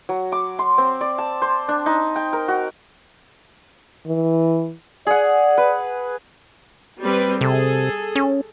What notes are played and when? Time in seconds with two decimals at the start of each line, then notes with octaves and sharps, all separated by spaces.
0.09 F#3
0.32 D6
0.59 C6
0.78 C4
1.01 D5
1.18 A5
1.42 C5
1.69 D4
1.86 D#4
2.16 G5
2.33 A#4
2.48 F#4
4.07 E3
5.07 G#4 D5 F#5
5.58 B4
7.00 G3 C4 B4
7.41 C3 G#4 A4
8.15 C#4